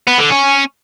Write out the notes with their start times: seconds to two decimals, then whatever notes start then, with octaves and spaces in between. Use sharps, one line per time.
0.07 B3
0.19 D3
0.30 C#4